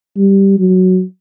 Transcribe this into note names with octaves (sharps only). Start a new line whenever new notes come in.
G3
F#3